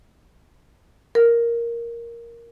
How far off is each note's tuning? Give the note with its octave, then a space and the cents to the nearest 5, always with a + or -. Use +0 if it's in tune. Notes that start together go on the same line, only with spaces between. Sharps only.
A#4 +5